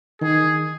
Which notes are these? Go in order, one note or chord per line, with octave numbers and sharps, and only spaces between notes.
D#3 G#4